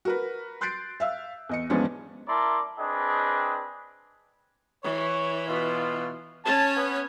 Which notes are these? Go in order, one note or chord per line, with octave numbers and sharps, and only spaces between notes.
F#4 A#4 B4
C6 F#6 G6 A6 C7 D7
E5 F5 E6
E2 D#5 C#7
E2 G#2 F3 B3 C#4 D4
E4 A#4 D5 A5 A#5 C6
C4 D4 G#4 B4 D#5 G5
E3 C#5
B2 F4
C#4 C#5 A5
B3